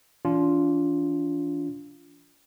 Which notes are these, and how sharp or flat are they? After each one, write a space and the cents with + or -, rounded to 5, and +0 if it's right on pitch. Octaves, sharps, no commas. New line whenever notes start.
E3 +0 D4 -40 F4 +0